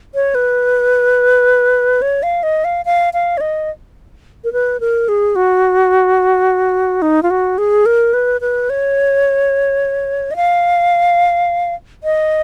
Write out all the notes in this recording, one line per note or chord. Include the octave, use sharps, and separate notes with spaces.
C#5
B4
C#5
F5
D#5
F5
F5
F5
C#5
D#5
A#4
B4
A#4
G#4
F#4
D#4
F4
F#4
G#4
A#4
B4
B4
C#5
D#5
F5
D#5